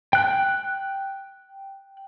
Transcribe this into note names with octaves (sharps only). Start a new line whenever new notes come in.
G5 F#6